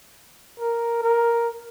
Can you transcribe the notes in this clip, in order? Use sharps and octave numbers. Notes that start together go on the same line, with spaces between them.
A#4
A#4